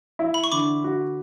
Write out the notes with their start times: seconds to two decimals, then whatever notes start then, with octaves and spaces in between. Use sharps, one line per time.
0.19 E4
0.34 B5
0.44 C#6
0.52 D3 B5 D6
0.84 F#4